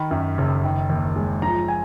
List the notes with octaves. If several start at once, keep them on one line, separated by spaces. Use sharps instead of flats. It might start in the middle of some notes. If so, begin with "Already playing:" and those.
Already playing: D#3 B5
F#2
F#1
D#3
D#2
G#3
F3 A#5
G#5